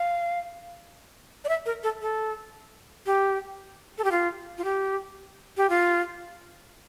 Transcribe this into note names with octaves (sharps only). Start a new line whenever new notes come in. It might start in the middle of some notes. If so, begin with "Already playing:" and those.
Already playing: F5
D5
E5
A#4
A4
A4
G4
A4
G4
F4
F4
G4
G4
F4